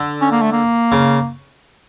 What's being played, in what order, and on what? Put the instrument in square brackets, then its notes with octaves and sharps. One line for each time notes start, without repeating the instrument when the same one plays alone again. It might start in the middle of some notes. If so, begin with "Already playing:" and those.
Already playing: [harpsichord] D3
[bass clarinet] C#4
A#3
A3
A#3
[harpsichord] C#3